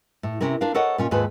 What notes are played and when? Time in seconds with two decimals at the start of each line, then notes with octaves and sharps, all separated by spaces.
0.23 A2
0.41 C3 C#4 E4 A#4
0.61 D4 F4 A#4 F5
0.75 A4 A#4 C#5 D#5 F#5
0.98 A#2 C#4 F4
1.11 D#2 G#2 A3 F4 B4 G#5